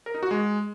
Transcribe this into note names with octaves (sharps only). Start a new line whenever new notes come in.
A#4
D#4
F#4
G#3